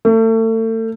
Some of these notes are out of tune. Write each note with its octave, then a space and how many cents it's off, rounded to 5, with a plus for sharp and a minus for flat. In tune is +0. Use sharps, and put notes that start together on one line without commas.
A3 +35